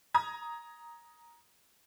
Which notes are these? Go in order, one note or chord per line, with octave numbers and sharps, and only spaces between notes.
A#5 D#6 G#6